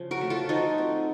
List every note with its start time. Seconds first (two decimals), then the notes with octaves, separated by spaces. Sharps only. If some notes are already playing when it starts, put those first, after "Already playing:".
Already playing: C#3 F3
0.11 F#4 A#4
0.21 A3
0.30 F4 A4
0.49 F3 D#4 F#4
0.78 C4